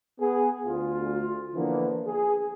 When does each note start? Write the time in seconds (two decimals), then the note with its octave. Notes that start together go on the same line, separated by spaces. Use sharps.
0.20 B3 G#4
0.66 D2 F4
1.55 D3 E3 F3 A#3 B3
2.06 G#4